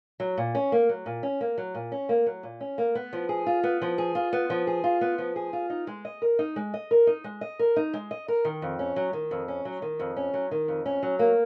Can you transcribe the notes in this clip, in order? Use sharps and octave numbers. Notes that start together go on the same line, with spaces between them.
F#3
A#2
C#4
A#3
F#3
A#2
C#4
A#3
F#3
A#2
C#4
A#3
F#3
A#2
C#4
A#3
B3
F3
G#4
F4
B3
F3
G#4
F4
B3
F3
G#4
F4
B3
F3
G#4
F4
D#4
G#3
D#5
A#4
D#4
G#3
D#5
A#4
D#4
G#3
D#5
A#4
D#4
G#3
D#5
A#4
D#3
F2
C#4
F#3
D#3
F2
C#4
F#3
D#3
F2
C#4
F#3
D#3
F2
C#4
F#3
A#3